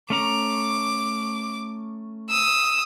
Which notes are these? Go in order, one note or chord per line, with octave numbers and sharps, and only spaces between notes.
A3 C#4 A#5 D6
D#6 E6